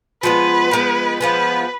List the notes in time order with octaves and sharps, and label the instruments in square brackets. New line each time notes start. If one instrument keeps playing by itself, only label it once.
[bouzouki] F3 G#3 B3 [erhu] B4
[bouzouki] F3 G#3 B3
[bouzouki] F3 G#3 B3 [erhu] B4